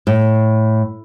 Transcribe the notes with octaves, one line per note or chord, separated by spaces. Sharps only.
A2